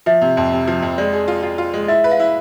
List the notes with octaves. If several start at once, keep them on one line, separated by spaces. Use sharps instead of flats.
F3 E5
C3
F2
C3
F3
F2
G#3 D5
G#4
F4
F4
F4
G#3
E4 E5
B4
F5
E4